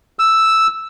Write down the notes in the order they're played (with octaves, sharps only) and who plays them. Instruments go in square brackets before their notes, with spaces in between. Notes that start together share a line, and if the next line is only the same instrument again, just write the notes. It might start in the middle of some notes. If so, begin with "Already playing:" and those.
[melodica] E6